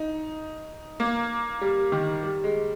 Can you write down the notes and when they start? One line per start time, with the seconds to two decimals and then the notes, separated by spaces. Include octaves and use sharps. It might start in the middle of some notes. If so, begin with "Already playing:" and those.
Already playing: D#4
1.00 A#3
1.61 G3
1.92 D#3
2.24 G3
2.44 G#3